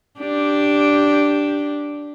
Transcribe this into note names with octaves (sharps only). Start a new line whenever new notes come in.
D4 G4